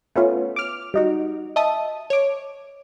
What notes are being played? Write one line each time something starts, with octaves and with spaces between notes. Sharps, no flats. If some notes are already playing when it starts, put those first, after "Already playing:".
A3 B3 C#4 F4
D6 F6
G3 D#4 F#4
D#5 E5 A5 D#6
C#5 D6